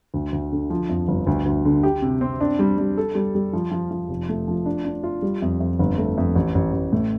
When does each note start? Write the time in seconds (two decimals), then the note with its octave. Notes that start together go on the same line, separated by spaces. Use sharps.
0.14 D2
0.33 D2
0.52 D3
0.70 F3
0.89 F2
1.08 G1
1.27 D2
1.46 D2
1.65 D3
1.83 G4
2.02 C3
2.21 C4
2.41 D4
2.59 G3
2.78 G3
2.97 A4
3.15 G3
3.35 G3
3.53 F3
3.71 F3
3.91 F3
4.09 F1
4.29 A3
4.48 F3
4.66 D4
4.85 D4
5.04 F4
5.22 G3
5.42 F2
5.60 F2
5.79 G1
5.98 A3
6.17 F2
6.35 A1
6.55 A1
6.73 A1
6.93 A2